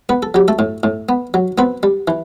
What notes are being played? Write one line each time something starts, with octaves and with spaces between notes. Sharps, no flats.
B3 B4
A4
F#3 G4
A3 A4
A2
A2
B3
F#3
B3 C4 B4
G3
E3